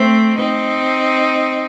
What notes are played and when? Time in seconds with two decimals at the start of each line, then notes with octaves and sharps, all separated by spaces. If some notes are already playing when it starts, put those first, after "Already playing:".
Already playing: A3 C4
0.38 C4 D#4